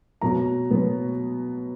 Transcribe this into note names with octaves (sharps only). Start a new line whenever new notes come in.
B2 F#3 B3 A#5
B2 F#3 B3